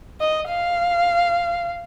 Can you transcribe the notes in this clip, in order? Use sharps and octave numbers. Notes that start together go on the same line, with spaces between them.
D#5
F5